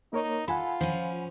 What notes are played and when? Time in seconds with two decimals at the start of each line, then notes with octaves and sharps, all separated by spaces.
0.13 A#3 D#4 A#4 C#5
0.48 F4 A4 F#5 G#5 B5
0.81 F3 C#4